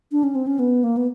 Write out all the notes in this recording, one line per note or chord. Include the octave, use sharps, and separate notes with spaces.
D4
C#4
C4
C#4
B3
A#3
B3